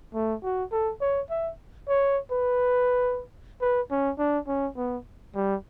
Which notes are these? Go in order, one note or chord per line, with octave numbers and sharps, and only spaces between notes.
A3
F#4
A4
C#5
E5
C#5
B4
B4
C#4
D4
C#4
B3
G3